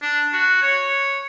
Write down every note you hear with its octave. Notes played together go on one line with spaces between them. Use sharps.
D4
F#4
C#5